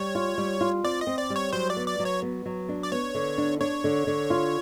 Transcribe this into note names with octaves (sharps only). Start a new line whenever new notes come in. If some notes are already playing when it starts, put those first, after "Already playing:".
Already playing: G3 C#5
F4
G3
F4
C4 D5
D#5
C4
D5
G3
C#5
F#3 C5
D5
B3
D5
F#3
C#5
B3
F#3
D4
D5
B3 C#5
D3
D4
D4 C#5
D3
D3
F4